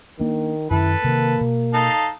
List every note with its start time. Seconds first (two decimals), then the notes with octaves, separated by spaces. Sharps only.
0.20 D#3 A#3 D4
0.71 F#2 D#3 E4 A4 B4
1.04 C3 D#3 A#3
1.41 B2
1.74 D#4 A4 F5